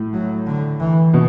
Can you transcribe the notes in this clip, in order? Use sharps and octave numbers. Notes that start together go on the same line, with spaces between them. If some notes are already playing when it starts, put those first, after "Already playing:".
Already playing: A2
F#3
D3
E3
B2